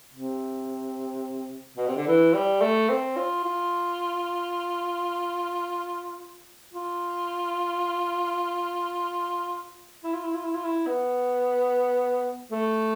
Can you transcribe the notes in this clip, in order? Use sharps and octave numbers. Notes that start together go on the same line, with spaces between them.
C3
B2
C3
D3
E3
G3
A3
C4
F4
F4
F4
E4
F4
E4
F4
E4
F4
E4
B3
A3